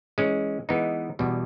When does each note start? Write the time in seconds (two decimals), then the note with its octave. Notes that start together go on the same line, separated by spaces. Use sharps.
0.18 E3 G#3 C#4
0.69 E3 G#3 B3 D#4
1.19 E2 B2 G3